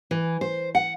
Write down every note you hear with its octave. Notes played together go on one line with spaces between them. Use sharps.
E3
C5
F#5